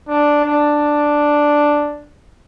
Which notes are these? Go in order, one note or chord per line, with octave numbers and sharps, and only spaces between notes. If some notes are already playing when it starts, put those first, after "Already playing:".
D4
D4